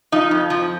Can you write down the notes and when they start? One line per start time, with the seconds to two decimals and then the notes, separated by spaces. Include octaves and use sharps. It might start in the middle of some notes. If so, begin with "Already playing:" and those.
0.12 F3 D#4
0.31 F2
0.50 F3